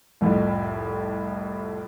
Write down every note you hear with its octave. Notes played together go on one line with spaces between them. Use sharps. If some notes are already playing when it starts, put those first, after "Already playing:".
C2 F2 A2